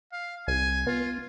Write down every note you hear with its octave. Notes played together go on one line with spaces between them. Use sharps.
F5
C2 G#5
B3 F4